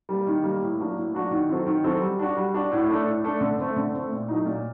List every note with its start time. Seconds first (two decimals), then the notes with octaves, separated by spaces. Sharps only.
0.09 G3 A#3
0.27 D#3
0.44 G3 A#3
0.61 A2
0.79 F#3 A#3 D4 F#4
0.96 A2
1.14 F#3 A#3 D4 F#4
1.31 D#3
1.49 F#3 C4 F#4 A4
1.66 D#3
1.84 F#3 C4 F#4 A4
2.01 G3
2.19 D4 F#4
2.37 G3
2.54 D4 F#4
2.72 A2
2.89 A3 D4 A4
3.06 A2
3.24 A3 D4 A4
3.41 D3
3.59 A3 C4
3.77 D3
3.93 A3 C4
4.12 A#2
4.28 F#3 A3 D#4
4.46 A#2